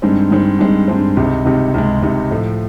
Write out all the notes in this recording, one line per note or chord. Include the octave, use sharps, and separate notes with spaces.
G2 D#3 G#3 C4
G2 D#3 G#3 C4
G2 D#3 G#3 C4
G2 D#3 G#3 C4
C#2 C3 D#3 G#3
C#2 C3 D#3 G#3
C#2 C3 D#3 G#3
C#2 C3 D#3 G#3
A2 F3 A3